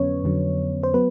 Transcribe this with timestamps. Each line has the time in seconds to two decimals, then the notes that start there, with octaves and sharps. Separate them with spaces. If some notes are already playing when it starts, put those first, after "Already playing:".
Already playing: F2 D3 F#3 B3 C#4 B4 C#5
0.24 F2 D3 F#3
0.83 C5
0.94 F#3 B3 B4